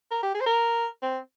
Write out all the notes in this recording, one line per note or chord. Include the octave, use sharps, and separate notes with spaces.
A#4
G4
G#4
C5
A#4
C4